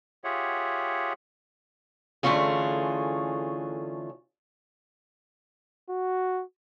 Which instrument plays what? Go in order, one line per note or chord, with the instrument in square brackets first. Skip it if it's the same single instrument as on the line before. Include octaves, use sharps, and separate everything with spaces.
[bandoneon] F4 G4 G#4 C#5 E5 F#5
[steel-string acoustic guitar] D3 E3 A3 C#4 F4 G#4
[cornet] F#4